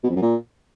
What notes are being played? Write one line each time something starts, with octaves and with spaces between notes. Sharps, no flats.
B2
F2
F#2
A#2